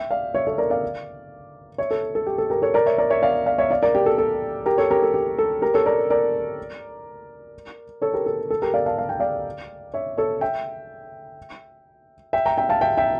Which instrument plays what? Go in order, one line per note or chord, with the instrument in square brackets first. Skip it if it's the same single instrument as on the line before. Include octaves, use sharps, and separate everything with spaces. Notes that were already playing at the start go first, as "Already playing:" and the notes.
Already playing: [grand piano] E5 G5
D5 F5
C#5 E5
A4 C#5
A#4 D5
D5 F5
C#5 E5
A4
A4
G4
A4
G4 A#4
A4 C#5
A#4 D5
C#5 E5
A#4 D5
C#5 E5
D5 F5
D5 F5
C#5 E5
D5 F5
A#4 D5
G4
A4
A4
G4 A#4
A4 C#5
G4 A#4
A4
G4
A4
G4 A#4
A4 C#5
A#4 D5
A#4 D5
A4 C#5
G4 A#4
A4
A4
G4 A#4
D5 F5
F5 A5
F5
G5
D5 F5
C#5 E5
A4 C#5
E5 G5
E5 G5
G5 A#5
E5 G5
F5 A5
E5 G5
E5 G5